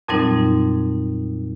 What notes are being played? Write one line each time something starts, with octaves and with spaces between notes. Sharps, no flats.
F2 A#2 F#3 G3 C4 D#4